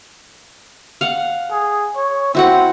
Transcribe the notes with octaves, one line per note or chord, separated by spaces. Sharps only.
F5 F#5
G#4
C#5
C4 E4 F#4 F#5